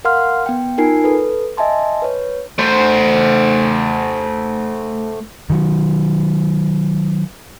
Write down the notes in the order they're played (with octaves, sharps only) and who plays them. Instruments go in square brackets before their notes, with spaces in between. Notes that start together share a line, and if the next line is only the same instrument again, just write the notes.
[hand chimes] A#4 F5 F#5 C6 F6
B3 G5
D#4 F4 A#4 G#5 C7
A4 B4
D#5 E5 G#5 A5 C6
B4 C#5
[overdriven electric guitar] A3 C5
[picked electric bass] D#3 F#3